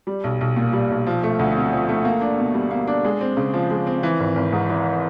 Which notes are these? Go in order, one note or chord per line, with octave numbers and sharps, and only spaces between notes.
G3
B1
B1
A#2
G3
B1
F3
A3
D2
C3
F3
A3
A#3
D4
B2
G3
A#3
D4
G#3
C4
C#3
F3
G#3
C4
E3
G#1
G#1
G#2
E3